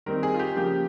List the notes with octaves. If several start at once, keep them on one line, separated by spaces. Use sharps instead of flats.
D#3 G3 C4 D#4 A#4
G#4
F4
G4
C#3 F3 A#3 G4